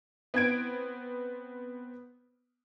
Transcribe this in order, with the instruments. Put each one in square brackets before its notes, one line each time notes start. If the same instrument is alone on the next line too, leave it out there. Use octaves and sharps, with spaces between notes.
[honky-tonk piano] B3 C4 G#6 D7